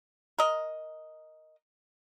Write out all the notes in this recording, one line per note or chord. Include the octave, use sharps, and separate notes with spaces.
A#4 D#5